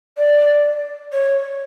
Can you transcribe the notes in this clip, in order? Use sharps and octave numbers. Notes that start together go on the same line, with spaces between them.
D5
C#5